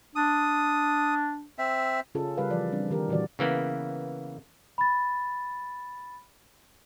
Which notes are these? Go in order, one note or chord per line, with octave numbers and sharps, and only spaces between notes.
D4 D#6
C4 E5
C#3 C#4 F4 G#4 A4
C#3 G3 G4 A#4 B4 F5
E3 F3 D5
G3 C4 D4
D#3 G4 A#4
A#2 D3 E3 G3 F#4 D5
C#3 E3 A#3 B3
B5 A6